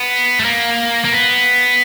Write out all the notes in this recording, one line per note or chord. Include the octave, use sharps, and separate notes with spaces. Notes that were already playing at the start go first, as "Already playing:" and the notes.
Already playing: B3
A3
A#3
A#3
B3